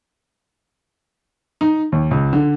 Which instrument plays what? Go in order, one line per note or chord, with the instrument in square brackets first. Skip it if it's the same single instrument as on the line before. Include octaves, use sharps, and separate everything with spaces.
[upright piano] D#4
D#2
C#2
D3